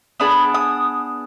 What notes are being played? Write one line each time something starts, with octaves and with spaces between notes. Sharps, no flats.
B3 D4 G#4 B5
D#6